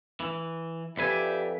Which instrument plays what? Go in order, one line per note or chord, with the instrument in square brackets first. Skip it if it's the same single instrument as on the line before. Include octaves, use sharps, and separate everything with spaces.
[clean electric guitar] E3
[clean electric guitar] F2 B4 G#5 [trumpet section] G4 D5 E5